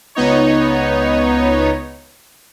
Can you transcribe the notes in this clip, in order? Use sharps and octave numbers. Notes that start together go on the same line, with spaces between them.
C#2 B3 D#4 C#5